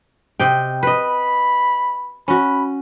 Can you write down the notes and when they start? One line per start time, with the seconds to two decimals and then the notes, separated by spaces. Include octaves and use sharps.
0.40 C3 D#5 G5
0.83 B4 D#5 B5
2.28 C#4 F#4 B5